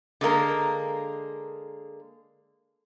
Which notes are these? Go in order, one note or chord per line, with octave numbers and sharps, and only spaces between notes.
D3 G#3 A#3 A#4